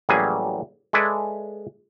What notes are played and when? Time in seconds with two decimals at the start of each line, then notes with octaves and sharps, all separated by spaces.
0.09 A1 F#3 G3 A#3 G#4 G#5
0.93 G#3 A4 B4 D5 E5 G#5